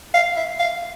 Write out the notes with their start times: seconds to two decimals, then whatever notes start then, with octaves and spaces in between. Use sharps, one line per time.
0.14 F5
0.36 E5
0.60 F5